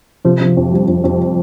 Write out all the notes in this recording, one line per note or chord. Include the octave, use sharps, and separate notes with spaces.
C3 F3
C3
F2
G3
F2
F2